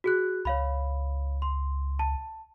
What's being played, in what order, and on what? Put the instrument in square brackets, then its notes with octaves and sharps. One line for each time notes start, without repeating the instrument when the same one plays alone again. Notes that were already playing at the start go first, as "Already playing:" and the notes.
[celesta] F#4 G#4 F#6
[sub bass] C#2 [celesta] C#5 F5 B5
[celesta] C6
A5